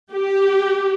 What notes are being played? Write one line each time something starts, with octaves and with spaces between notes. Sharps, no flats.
G4